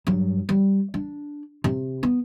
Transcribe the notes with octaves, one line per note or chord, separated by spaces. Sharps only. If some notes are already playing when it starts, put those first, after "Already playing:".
G2 F#3
G3
D4
C3
B3